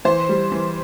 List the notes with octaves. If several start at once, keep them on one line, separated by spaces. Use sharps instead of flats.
E3 C5
G3
E3